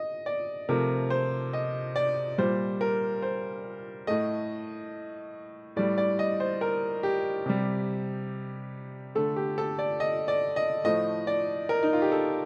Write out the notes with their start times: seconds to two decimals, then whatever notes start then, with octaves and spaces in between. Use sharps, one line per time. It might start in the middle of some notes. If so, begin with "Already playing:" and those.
Already playing: D#5
0.26 D5
0.69 C3 F3 A3 A#4
1.10 C5
1.53 D#5
1.96 D5
2.38 A#2 G3 C5
2.81 A#4
3.22 C5
4.07 A2 A3 D#5
5.76 A2 G3 D5
5.98 D5
6.19 D#5
6.40 C5
6.61 A#4
7.03 G4
7.46 C3 G3
9.15 D3 A3 A4
9.36 G4
9.58 A4
9.79 D5
10.00 D#5
10.28 D5
10.56 D#5
10.84 A2 F3 A3 D#5
11.27 D5
11.69 A#4
11.83 D#4
11.93 F4
12.02 G4
12.12 A4